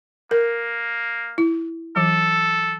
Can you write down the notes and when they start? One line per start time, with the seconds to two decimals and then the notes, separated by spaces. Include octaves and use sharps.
0.31 A#3 A#4
1.38 E4
1.96 E3 F#3 A4